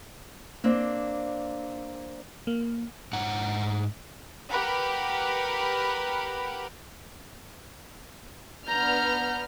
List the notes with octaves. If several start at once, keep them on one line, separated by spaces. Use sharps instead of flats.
A#3 C4 D4
A#3
G#2 F#5 A#5
G4 A#4 B4 F#5 B5
B3 D4 A#5 F6 G6